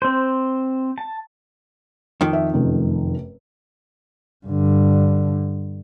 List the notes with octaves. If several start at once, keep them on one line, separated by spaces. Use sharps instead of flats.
C4 C5
A5
F2 D#3
E5
F1 F#2 A3
G2 D3